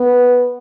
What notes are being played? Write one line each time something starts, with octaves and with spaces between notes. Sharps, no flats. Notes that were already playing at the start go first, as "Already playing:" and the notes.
Already playing: B3